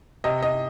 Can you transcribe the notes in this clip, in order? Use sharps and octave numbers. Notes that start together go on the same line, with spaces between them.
C3 D#5
D#5